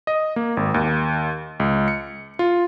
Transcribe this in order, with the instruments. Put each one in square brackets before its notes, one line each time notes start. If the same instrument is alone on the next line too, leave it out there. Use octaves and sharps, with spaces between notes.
[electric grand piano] D#5
A#3
G#1
D#2
C#2
C#7
F4